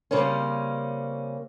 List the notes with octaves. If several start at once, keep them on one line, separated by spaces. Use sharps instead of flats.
C#3 G3 A#3 C4 C#4